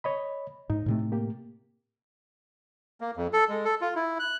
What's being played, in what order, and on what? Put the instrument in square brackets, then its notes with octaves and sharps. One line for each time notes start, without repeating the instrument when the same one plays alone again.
[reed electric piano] C#5 D#5 B5
[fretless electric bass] G#2 [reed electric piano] D#4
[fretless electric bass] A2 C3 A3
[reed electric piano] A#3 G4
[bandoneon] A#3
F2
A4
G#3
A4
F4
E4
F#6